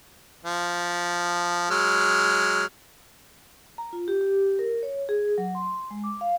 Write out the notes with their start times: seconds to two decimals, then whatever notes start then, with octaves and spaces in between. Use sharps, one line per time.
0.45 F3
1.71 F#3 G#3 F6
3.78 A#5
3.93 F4
4.08 G4
4.21 G4
4.59 A#4
4.83 C#5
5.09 G#4
5.38 F#3
5.55 C6
5.91 G#3
6.04 D6
6.21 F5